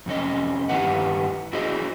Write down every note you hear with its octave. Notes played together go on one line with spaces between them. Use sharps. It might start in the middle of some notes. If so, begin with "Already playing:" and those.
F2 C3 C#4 D#5
G2 D#3 E4 G4 B4 F#5
E4 F#4 G#4 C5 D#5